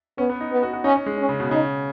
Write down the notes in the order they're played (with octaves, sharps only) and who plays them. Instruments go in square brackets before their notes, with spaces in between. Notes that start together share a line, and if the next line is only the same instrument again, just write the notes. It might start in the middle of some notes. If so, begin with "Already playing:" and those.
[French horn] B3 [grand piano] C#4
[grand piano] B3
D#4
[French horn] B3
[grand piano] F#4
F#4
[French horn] C#4 [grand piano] D#4
[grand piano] C#4
G#3
[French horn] C#4
[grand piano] C#3
B2
[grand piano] C#3 [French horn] D#4